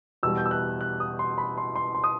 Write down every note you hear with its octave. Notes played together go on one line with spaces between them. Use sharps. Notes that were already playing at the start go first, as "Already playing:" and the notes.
E2 B2 G3 E6
G6
E6
F#6
F#6
D#6
C6
B5
C6
C6
C6
D#6